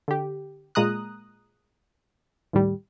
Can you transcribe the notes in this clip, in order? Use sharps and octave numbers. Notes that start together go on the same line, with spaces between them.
D3 G4
A#2 G#3 A#5 D#6 F#6
D#2 A2 G3